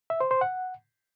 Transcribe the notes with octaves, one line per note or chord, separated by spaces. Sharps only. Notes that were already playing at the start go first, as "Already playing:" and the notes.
E5
C5
C5
F#5